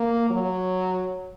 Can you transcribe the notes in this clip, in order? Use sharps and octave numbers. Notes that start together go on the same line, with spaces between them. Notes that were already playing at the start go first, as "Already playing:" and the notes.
Already playing: A#3
F#3